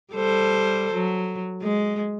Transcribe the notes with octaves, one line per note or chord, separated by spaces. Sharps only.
G3 A4 C5
F#3
G#3